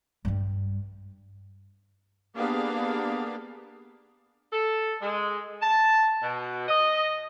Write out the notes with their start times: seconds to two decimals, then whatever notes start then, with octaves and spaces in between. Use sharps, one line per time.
0.25 G2 G3
2.35 A#3 B3 D4 G4 G#4 F5
4.53 A4
5.02 G#3
5.62 A5
6.22 B2
6.68 D#5